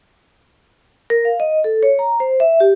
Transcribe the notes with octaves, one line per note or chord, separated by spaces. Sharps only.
A#4
F5
D#5
A4
C#5
A#5
C5
E5
G4